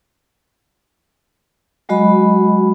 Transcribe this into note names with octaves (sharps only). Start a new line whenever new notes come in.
F#3 G#3 F#4 D#5 B5